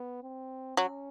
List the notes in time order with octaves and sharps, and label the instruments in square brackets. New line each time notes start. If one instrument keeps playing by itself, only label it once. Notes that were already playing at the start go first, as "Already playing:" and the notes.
Already playing: [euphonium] B3
C4
[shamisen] F#3 [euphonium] C#4